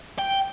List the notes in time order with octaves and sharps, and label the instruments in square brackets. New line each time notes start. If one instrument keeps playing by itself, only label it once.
[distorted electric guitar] G5